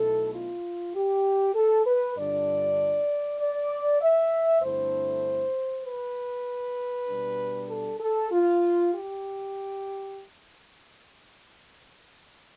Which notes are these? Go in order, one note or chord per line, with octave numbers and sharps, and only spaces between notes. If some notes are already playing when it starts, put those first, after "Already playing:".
Already playing: B1 B2 A3 E4 A4
F4
G4
A4
B4
G2 D3 G3 D4 F4 D5
D5
E5
G2 D3 A3 C4 E4 C5
B4
B2 G3 D4
A4
A4
F4
G4